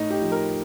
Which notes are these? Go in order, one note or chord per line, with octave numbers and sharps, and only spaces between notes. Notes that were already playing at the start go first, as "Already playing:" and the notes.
Already playing: A2 D#4
G4
F3
A#4